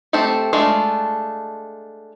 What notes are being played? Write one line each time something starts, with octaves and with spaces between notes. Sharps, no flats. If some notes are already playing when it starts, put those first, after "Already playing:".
A3 C4 G4 A4
G#3 A3 D4 F4